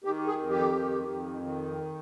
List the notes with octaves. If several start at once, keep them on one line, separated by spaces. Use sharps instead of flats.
D#3 G4
G#4
F2
G4
D#3
F2
D#3